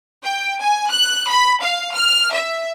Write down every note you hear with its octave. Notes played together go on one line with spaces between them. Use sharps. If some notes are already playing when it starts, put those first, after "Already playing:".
G5
G#5
F#6
B5
F5
F6
E5